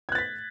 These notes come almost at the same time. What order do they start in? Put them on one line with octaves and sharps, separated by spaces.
G#6 F#6 A6 B6